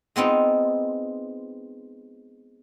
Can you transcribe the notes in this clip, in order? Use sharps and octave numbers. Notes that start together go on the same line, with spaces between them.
G#3 B3 C4 D#4 F4